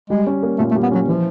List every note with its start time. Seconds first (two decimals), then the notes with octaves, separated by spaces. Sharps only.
0.10 G3 G#3
0.27 C#4
0.43 A#3
0.58 A#2 A3
0.71 A3
0.75 G3
0.83 B3
0.91 F#3 C#4
1.08 E3 F3